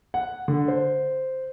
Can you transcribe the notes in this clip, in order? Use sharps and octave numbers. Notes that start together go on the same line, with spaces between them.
F#5
D3
C5